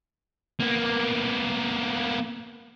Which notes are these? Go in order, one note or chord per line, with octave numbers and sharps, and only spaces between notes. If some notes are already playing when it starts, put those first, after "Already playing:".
A#3 B3